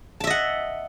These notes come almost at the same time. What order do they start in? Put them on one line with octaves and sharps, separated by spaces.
A5 E5 D#5 F#5